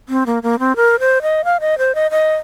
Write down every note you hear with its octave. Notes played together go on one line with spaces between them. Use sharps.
C4
A#3
A#3
C4
A#4
C5
D#5
F5
D#5
C5
D#5
D#5